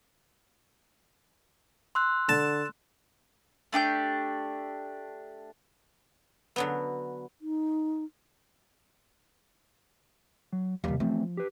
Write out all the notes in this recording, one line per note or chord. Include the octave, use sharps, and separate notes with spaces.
C6 E6 F#6
D3 A5
A3 D4 G4 G6
D3 F#3 B3
D#4
F#3
D#2 C3 D#3 G3 F5
E2 F3 A3 C4
G4 B4